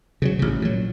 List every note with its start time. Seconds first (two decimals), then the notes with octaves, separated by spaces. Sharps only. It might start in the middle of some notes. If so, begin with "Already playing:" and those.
0.22 C#3 E3 F#3
0.39 A1 C#3
0.62 A#2 F#3